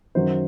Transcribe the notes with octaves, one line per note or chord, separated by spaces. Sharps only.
F#2 D#3 F#3 C5